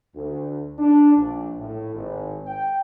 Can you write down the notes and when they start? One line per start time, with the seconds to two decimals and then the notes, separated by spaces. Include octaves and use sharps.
0.15 D2
0.78 D4
1.15 A#1
1.58 A2
1.94 G#1
2.46 G5